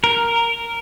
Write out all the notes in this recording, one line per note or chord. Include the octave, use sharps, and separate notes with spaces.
A#4